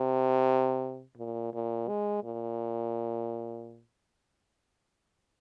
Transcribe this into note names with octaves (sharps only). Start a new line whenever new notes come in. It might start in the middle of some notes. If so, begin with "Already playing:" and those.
Already playing: C3
A#2
A#2
G#3
A#2